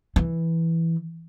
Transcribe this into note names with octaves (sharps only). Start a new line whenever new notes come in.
E3